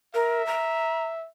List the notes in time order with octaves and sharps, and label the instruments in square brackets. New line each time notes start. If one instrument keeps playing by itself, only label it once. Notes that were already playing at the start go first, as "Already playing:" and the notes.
[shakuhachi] A#4 [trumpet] E5
[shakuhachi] A#5